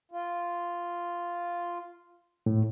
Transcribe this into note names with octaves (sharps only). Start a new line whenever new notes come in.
F4
A2